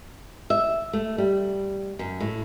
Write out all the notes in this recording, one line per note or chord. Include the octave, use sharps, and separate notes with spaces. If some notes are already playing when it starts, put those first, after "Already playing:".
E5
A3
G3
F#2
A2